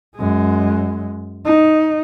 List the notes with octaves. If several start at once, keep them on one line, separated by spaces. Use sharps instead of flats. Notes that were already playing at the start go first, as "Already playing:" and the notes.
F#2 G#3
D#4